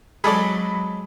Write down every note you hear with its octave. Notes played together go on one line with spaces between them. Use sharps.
F#3 G#3 C4 G#4 A4 D5 B5 D6